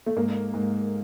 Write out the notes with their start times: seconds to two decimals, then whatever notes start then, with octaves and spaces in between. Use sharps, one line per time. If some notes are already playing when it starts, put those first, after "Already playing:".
0.06 A3
0.16 G#2 A#3
0.54 G#2